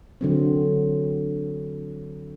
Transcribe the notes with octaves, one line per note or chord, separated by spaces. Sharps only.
D3 F#3 C4